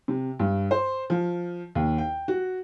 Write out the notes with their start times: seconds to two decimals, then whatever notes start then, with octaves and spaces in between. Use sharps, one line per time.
0.08 C3
0.39 G2
0.71 C5
1.10 F3
1.75 D#2
1.98 G5
2.28 F#4